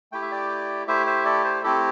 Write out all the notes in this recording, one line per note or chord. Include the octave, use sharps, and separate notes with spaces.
A3 E4 G4 G5
E5
D5 G5
A3 E4 G4 C5 E5
C5 E5
A4 D5
C5
A3 C4 E4 G4 A4